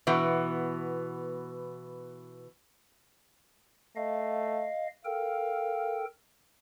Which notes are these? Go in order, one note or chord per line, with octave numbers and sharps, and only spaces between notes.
B2 E3 B3
A3 D#5 F5
A4 A#4 F5 G5